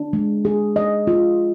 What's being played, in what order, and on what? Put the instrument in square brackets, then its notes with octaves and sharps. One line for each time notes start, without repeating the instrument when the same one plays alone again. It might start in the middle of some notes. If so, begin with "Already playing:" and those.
Already playing: [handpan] D4
G#3
G#4
D#5
F4